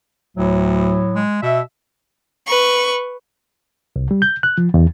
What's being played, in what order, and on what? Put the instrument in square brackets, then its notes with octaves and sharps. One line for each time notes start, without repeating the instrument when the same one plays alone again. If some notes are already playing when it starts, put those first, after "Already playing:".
[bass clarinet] D2 [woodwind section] A2 F#3
[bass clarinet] G#3
[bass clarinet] B2 [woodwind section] E5
[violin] B4 C#6
[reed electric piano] C2
G3
G6
F#6
F3
E2